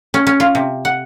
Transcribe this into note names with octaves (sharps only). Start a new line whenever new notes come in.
C#4
C#4
F4
C3
F#5